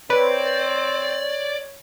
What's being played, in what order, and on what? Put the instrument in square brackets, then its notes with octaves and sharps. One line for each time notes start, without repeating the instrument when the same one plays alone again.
[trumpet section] C4 [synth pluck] B4 [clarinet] C#5 [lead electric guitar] D5